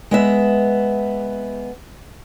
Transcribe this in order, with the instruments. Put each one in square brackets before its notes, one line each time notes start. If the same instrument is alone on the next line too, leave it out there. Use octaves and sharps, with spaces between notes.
[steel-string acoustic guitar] G#3 B3 E5